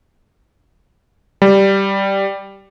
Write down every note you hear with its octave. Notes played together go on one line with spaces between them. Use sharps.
G3